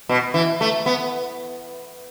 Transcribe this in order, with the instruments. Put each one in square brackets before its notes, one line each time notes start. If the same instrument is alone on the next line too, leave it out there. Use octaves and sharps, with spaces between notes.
[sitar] B2
E3
A3
B3